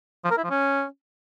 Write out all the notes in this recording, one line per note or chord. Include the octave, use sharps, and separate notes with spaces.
F3
A#4
E4
F3
C#4